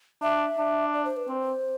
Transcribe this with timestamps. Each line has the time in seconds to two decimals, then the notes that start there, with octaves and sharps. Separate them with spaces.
0.22 D4 E5
0.58 D4
0.93 D5
1.05 C5
1.17 B4
1.28 C4 C5